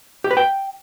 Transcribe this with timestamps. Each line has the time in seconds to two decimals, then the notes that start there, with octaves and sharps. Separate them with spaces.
0.24 G4
0.31 B4
0.37 G5